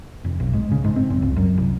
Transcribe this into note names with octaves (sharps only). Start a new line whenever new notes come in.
F1
B1
G#2
C#3
G#2
C4
F#1
C#2
F#2
C2